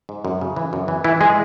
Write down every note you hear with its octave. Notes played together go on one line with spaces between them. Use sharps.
G#2
F#2
C#3
E3
F#2
E3
E3 E4
G#3 G#4